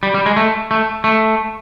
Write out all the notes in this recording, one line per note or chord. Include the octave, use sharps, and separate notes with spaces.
G3
G3
G#3
A3
A3
A3